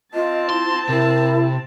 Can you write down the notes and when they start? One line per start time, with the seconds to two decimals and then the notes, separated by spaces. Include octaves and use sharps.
0.14 C4 F4 D#5 A5
0.50 E4 C6
0.89 C3 E4 A#4